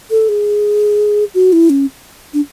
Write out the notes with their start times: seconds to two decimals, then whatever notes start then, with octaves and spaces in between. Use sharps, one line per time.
0.10 A4
0.29 G#4
1.35 F#4
1.53 E4
1.70 C#4
2.34 D4